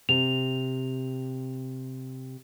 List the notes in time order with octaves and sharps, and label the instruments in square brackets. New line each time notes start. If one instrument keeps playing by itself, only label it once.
[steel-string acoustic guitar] C3 [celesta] F7